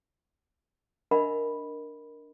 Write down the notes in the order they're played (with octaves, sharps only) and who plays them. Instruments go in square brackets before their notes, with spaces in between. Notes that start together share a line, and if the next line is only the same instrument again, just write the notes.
[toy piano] D4 A#4 D#5 E5 F#5 B5